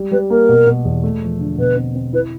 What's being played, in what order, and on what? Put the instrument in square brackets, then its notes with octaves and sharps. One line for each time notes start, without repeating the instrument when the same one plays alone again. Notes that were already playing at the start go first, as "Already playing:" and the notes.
Already playing: [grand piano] G3
[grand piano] G3 [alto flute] B4
[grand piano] A#3 [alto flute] A#4
[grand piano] B2
B2
E2
A3
F3
D3
[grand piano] B2 [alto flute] B4
[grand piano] C4
C4
[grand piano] E4 [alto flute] B4